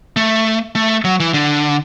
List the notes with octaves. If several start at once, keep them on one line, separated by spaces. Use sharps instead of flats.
A3
A3
F#3
E3
D3